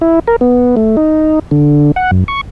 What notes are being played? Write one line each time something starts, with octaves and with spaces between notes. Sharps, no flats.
E4
A#4
B3
A3
D#4
D3
F#5
F#2
C#6